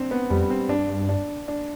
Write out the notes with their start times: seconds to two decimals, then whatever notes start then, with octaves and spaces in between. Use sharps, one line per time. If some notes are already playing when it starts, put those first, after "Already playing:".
Already playing: C4 D4
0.11 B3
0.30 F2 G3
0.50 C4
0.69 G2 D4
1.09 D4
1.48 D4